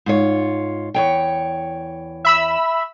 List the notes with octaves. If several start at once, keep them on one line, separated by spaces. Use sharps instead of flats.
G#2 F4 C#5
E2 C#5 G5
E5 B5 E6